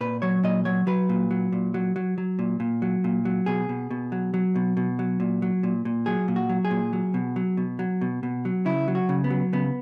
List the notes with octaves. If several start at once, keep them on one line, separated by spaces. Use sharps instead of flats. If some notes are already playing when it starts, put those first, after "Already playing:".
A#2 B4
F#3 C#5
A#2 D#5
F#3 C#5
F#3 B4
A#2
F#3
A#2
F#3
F#3
F#3
A#2
A#2
F#3
A#2
F#3
B2 G#4
B2
B2
F#3
F#3
B2
B2
F#3
A#2
F#3
A#2
A#2
F#3 G#4
A#2
F#4
F#3
G#4
A#2
F#3
B2
F#3
B2
F#3
B2
B2
F#3
C#3 E4
F#3
F#4
C#3
B3
F#3
C#3 B3